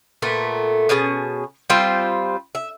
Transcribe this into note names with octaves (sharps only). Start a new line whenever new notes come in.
A#2 A3 B3
B2 C#4 G#4 A5
G3 C4 F4 C5
E5